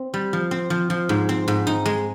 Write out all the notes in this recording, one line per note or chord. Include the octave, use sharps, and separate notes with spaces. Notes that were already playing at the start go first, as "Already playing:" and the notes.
Already playing: C4
G3
F3
C4
F3
F3
G#2
C4
G#2
D#4
G#3